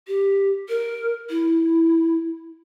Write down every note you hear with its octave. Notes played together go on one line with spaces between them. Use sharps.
G4
A#4
E4